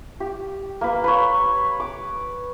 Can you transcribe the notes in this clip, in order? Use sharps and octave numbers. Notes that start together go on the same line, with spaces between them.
G4
A#3 B4
B4 C#5
D6